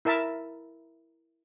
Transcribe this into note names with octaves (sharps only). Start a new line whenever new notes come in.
E4 A#4 E5 A5